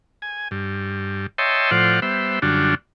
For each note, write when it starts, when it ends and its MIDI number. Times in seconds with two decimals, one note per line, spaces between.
0.22 0.48 80
0.51 1.27 43
1.38 1.71 73
1.38 1.71 75
1.38 1.71 76
1.38 1.71 79
1.38 1.71 81
1.38 1.71 84
1.71 2.00 45
1.71 2.00 53
1.71 2.00 65
1.71 2.00 72
1.71 2.00 74
1.71 2.00 78
2.02 2.39 55
2.02 2.39 59
2.02 2.39 72
2.02 2.39 76
2.42 2.75 42
2.42 2.75 50
2.42 2.75 55
2.42 2.75 62
2.42 2.75 65
2.42 2.75 66